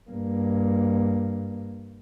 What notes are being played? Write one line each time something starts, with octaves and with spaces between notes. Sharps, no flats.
G2 A#3